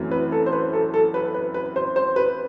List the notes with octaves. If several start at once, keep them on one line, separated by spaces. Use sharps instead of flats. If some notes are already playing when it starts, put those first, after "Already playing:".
Already playing: F#2 E3 A3 C4
B4
A4
C5
B4
A4
A4
B4
B4
B4
C5
C5
B4